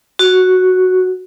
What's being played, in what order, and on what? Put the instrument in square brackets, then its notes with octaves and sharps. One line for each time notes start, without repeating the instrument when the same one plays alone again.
[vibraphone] F#4